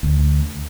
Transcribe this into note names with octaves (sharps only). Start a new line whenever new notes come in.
D2